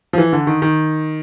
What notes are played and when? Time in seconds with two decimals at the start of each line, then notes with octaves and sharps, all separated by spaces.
0.13 F3
0.18 E3
0.33 D3
0.47 D#3
0.62 D#3